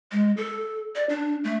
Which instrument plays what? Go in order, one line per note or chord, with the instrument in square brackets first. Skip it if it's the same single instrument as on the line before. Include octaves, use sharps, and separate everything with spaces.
[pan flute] G#3
A4
D5
D4
A3